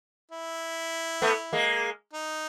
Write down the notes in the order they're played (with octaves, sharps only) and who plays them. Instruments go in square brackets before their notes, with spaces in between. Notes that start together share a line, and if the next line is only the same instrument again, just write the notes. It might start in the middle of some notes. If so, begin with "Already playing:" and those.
[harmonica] E4
[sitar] A3 B3
G#3 A#3
[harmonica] D#4